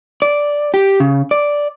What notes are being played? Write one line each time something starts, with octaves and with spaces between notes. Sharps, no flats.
D5
G4
C#3
D5